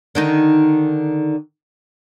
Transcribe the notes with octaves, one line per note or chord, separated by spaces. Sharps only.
D3 D#3 D#4